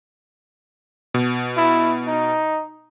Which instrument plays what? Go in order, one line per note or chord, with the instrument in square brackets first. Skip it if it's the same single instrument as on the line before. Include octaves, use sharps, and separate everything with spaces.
[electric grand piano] B2
[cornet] E4
D#4